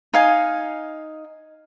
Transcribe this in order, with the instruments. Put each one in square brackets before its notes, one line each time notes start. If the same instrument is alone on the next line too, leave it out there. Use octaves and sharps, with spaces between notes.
[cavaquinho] D#4 F5 G#5